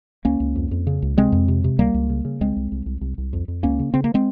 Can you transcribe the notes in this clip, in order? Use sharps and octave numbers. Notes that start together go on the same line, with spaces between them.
C#2 A#3 C#4
C#2
F2
F2
C#3
C#2
C3 G#3 C4
F2
C3
C3
C#2 G3 A#3
C#2
C#3
C#3
C2 G#3 C4
C2
C2
C2
C2
C2
F2
F2
C#2 A#3 C#4
C#3
C#3 C4
A#3
G#3 C4